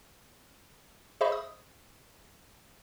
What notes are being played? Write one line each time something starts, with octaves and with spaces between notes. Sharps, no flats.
G#4 C5 D#5 E5 B5 C#6
D#6